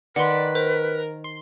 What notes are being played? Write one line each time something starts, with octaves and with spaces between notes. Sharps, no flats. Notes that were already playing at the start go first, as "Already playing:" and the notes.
D#3 B4 D5 F#5 C6
A#4 C5
C6